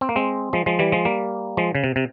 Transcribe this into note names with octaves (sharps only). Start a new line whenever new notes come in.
C4
A#3
G#3 C4
F3 G#3
F3 G#3
E3 G3
F3 G#3
G3 A#3
F3 G#3
C#3
C3
C3